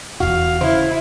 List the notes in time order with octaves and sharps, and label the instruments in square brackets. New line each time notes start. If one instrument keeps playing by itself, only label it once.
[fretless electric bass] E1 E2 [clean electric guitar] F#4 [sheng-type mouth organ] F5
[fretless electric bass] C#3 [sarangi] E4 [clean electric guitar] C5